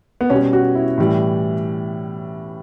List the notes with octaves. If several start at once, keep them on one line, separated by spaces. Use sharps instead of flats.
B3
B2 G3 C#4
F#4
E4
A2 E3 G3